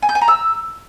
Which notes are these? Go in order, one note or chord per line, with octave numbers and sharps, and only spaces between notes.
G#5
G6
G#5
A#5
E6